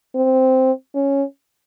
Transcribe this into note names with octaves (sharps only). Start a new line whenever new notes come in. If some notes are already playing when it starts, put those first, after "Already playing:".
C4
C#4